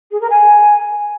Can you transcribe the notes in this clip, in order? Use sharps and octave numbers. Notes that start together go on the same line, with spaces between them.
G#4
A#4
G#5